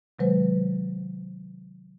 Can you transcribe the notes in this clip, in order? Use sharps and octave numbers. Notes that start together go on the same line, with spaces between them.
C3 D#3 F#3 G#3 B4 C5